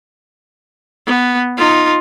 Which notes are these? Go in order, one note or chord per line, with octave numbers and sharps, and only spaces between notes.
B3
D#4 F4